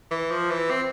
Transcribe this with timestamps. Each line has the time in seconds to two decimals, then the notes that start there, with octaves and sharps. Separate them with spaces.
0.11 E3
0.31 F3
0.51 E3
0.70 C4